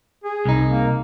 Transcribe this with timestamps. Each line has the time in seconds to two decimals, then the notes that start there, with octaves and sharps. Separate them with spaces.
0.24 G#4
0.45 C2 D#4
0.70 A#3